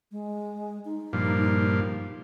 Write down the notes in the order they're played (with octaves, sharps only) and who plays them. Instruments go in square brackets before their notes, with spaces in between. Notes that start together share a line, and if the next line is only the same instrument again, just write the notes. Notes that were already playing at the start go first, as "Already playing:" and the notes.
[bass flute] G#3
D#4
[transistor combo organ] G2 A#2 F3